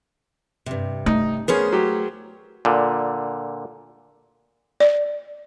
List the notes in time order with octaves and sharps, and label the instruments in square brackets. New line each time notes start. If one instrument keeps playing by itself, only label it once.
[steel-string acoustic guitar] G2 C3
[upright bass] A3 [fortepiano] D#4
[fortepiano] B3 C#4 [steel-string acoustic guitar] G#4 A#4 C5
[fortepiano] F#3 G4
[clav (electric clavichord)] A#2 D3
[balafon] D5